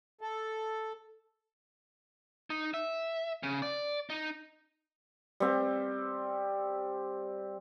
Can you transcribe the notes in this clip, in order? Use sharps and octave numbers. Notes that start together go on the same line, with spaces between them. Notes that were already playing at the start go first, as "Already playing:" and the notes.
A4
D#4
E5
C#3
D5
D#4
G3 C4